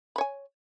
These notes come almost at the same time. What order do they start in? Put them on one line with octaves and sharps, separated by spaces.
B5 C#5 G#5